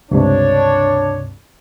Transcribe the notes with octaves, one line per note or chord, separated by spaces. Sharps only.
C#2 G2 C3 D4 C#5